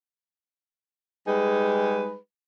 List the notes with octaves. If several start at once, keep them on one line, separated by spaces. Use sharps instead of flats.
G3 G#3 D#4 G#4 B4